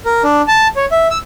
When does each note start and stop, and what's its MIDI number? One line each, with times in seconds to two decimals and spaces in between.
0.06 0.23 70
0.24 0.42 62
0.48 0.68 81
0.76 0.86 73
0.92 1.08 76
1.11 1.18 88